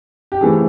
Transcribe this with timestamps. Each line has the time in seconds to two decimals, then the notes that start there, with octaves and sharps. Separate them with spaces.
0.32 G4
0.41 C#3 E3 A3 C4 G#4